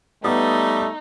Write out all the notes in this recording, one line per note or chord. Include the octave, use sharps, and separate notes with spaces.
G3 A3 B3 D#4 D#6